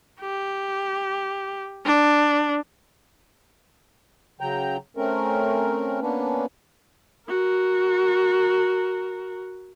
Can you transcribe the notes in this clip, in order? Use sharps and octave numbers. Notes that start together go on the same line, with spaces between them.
G4
D4
C#3 F#3 G5 A#5
A3 C4 C#4 A#4
A#3 B3 C#4 D4 B4
F#4 A#4